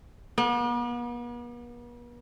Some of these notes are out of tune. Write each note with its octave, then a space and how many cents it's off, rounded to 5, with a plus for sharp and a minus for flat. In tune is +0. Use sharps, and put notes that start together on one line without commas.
B3 -45